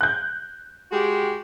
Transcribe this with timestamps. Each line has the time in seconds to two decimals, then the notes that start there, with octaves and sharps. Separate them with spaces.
0.01 F#6 G6
0.92 G#3 F#4 G4